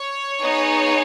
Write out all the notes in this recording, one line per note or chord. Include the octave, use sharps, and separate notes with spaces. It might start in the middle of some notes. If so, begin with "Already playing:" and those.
Already playing: C#5
B3 D#4 G#4